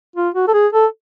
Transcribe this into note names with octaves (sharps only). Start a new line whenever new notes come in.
F4
F#4
A4
G#4
A4